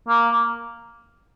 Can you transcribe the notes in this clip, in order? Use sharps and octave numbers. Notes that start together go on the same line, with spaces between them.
A#3